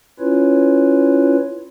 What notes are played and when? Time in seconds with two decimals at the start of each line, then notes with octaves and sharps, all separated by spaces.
0.20 C#4 E4 F4 B4 C#5